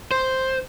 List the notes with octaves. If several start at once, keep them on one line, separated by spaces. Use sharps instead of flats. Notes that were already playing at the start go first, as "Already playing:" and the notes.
C5